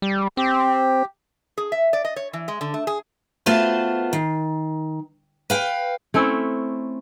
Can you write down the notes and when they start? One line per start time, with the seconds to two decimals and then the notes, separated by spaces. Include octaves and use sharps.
0.02 G3
0.37 C4 G4
1.58 G#4
1.72 E5
1.93 D5
2.05 D#5
2.16 C#5
2.33 E3
2.48 G#3
2.61 D3
2.74 A3
2.87 G#4
3.46 A3 B3 F4 F#4 C5
4.13 D#3
5.50 B4 F5 G5
6.14 A3 C4 C#4 E4